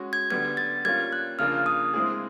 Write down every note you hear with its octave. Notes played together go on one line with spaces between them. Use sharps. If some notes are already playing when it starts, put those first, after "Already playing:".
Already playing: G#3 C#4 F#4
G#6
D3 G3 B3 G#6
A6
G3 A#3 C#4 F4 G#6
F#6
C#3 F3 A#3 D4 F6
D#6
G#3 C4 E4 G#4